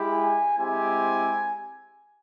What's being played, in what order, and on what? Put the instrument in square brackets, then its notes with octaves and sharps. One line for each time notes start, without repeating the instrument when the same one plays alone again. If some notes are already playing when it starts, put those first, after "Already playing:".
Already playing: [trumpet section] G#3 E4 G4
G#5
G#3 C4 E4 G4 G#5